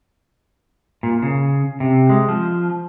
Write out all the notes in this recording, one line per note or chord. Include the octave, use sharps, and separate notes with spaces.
A#2
C#3
C3
G#3
F3